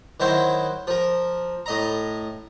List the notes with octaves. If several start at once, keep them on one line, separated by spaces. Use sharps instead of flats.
D#3 F#3 E4 C5 E5 C6
F3 A#4
A2 D#5 A#5